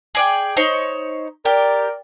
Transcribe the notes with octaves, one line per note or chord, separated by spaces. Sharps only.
G#4 D5 G5
D#4 C5 C#5
G4 A#4 D5